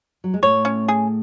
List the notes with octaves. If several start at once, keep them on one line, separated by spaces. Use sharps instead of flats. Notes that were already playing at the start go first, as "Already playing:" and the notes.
F#3
G#3
A2 A3 C#5
C#4
G#4